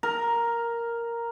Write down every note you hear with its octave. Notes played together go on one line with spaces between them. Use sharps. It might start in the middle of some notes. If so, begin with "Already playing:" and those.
A#4